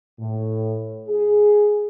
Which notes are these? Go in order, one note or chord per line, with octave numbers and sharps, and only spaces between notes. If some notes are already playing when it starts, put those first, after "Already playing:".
A2
G#4